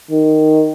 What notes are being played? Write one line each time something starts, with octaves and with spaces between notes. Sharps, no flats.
D#3